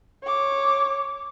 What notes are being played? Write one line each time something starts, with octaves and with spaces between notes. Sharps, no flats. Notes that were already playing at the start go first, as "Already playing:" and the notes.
C#5 D6